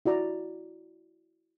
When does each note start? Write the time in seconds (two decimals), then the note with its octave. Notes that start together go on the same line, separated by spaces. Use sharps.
0.06 E4 F#4 D5 A#5